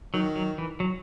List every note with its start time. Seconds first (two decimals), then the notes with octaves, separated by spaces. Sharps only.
0.14 D#3 F#3
0.36 F#3
0.58 E3
0.80 F#3